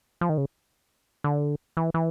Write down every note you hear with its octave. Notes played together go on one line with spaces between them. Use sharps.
F3
D#3
C#3
D3
E3
E3